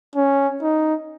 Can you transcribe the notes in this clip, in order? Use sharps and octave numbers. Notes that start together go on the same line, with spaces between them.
C#4
D#4